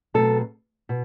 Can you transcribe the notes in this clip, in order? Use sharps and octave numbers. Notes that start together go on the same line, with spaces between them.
B2 F#3 A3 C4 A4
B2